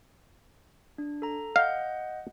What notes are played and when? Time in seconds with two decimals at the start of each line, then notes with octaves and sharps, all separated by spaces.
0.98 D4
1.22 A4 A#5
1.56 D#5 F5 F#5 G6